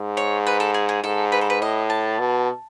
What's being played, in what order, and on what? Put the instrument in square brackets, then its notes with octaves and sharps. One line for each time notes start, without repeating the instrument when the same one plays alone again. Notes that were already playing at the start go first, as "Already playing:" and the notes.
Already playing: [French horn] G#2
[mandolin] C#5
B4
A4
G#4
G#4
[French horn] G#2 [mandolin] A4
[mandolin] B4
A4
B4
[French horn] A2 [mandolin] D#5
[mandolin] A5
[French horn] B2